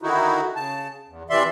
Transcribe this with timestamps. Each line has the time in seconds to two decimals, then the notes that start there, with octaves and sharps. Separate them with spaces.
0.02 D3 D#3 D#4 E4 F#4
0.56 C#3 A5
1.08 E2
1.30 C3 E3 D5 E5 C6